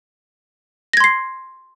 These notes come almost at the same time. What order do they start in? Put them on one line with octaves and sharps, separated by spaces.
A#6 G#6 C6 C7